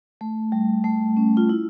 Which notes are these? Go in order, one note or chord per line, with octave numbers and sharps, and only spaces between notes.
A3
G3
A3
C#4
F4
E4